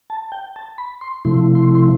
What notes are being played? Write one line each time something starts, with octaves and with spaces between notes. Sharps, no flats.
A5
G5
A5
B5
C6
C3 F3 A3 E4 C6
C6
C6